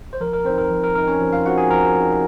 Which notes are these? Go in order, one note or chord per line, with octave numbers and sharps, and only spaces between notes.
C5
F3 A#4
A#4
C4 D#4 C5
A#4
F3
A#4
C4 D#4 A#4
C#4 C#5
F3
F4 F5
C4 D#4 F#4 F#5
G#4 G#5
F3 A#4 A#5
C4 D#4